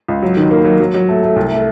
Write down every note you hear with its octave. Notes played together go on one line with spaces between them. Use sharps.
C#2
F#3
D#3
A#3
F#3
F#3
F#3
A3
A3
C2
A3